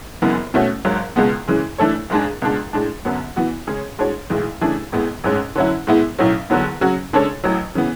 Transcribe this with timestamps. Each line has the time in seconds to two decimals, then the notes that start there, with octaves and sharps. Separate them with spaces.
0.22 F#1 F#2 E3 B3
0.54 B2 A3 C#4 F#4
0.85 G#1 G#2 F#3
1.16 C#2 B2 G#3 B3
1.48 C#3 E3 G#3
1.78 E3 A3 D4 A4 C#5
2.10 G#1 G#2 G#3 D4 G#4
2.42 C#2 B2 G#3 D4
2.73 A2 G#3 D4
3.05 F#2 D3 F#3 B3
3.36 E3 B3 F#4
3.67 C#3 G#3 C#4 G#4 C#5
3.99 A2 G#3 D4 F#4 C#5
4.30 B1 A2 E3 G#3
4.61 C#3 E3 A3 D4 G#4
4.92 A1 A2 G#3 B3
5.24 A1 G#2 G#3 C#4
5.56 D3 F#3 C#4 E4
5.87 A2 G#3 B3 E4
6.19 B1 A2 F#3 C#4 F#4
6.50 E2 D3 F#3 B3
6.81 C#3 F#3 C#4 F#4
7.13 C#3 G#3 D4 A4 C#5
7.44 A1 A2 F#3
7.75 C#3 E3 B3